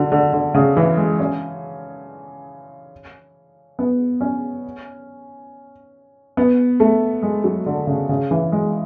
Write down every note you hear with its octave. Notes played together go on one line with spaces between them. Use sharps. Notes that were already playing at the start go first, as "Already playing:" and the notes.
Already playing: D3 F#3
D3
D3
C#3
E3
G#3
C#4
B3
C#4
B3
A3
G#3
F#3
D3
C#3
C#3
E3
G#3